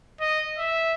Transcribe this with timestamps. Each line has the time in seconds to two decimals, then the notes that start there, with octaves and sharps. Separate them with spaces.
0.20 D#5
0.58 E5